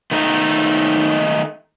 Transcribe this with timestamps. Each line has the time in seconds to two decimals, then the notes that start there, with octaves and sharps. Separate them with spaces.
0.11 D#3 A3 D#4